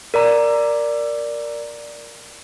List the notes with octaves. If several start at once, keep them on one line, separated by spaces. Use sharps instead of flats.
A#4 D5 A#5